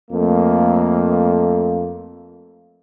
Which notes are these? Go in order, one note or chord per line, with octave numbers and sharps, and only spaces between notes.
F2 A3 A#3